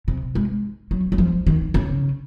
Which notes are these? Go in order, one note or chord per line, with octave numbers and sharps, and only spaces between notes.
C3
G#3
F#3
F#3
F3
D#3
C#3